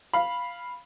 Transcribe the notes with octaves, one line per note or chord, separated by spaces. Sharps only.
F5 B5